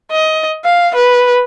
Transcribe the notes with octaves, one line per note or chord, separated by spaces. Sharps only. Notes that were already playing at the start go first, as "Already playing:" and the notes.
D#5
F5
B4